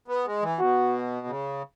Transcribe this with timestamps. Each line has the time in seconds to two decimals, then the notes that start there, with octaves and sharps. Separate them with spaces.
0.08 B3
0.26 G#3
0.43 E3
0.59 B2 F#4
1.27 C#3